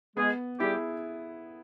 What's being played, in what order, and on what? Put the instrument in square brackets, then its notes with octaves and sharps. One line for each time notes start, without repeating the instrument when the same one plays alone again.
[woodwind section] G#3 G#4 [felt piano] B3
[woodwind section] G3 G4 [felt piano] E4 G#4